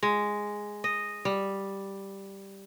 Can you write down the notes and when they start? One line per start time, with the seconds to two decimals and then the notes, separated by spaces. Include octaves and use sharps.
0.03 G#3
0.84 D#5
1.25 G3